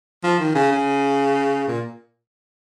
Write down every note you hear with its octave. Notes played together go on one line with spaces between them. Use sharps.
F3
D#3
C#3
C#3
A#2